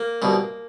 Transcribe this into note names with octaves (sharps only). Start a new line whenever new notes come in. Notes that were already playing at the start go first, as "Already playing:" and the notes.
Already playing: A#3
C2 B2